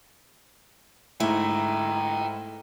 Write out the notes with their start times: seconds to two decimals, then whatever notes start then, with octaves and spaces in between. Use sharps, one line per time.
1.20 G#2 A3 E4 G5 A#5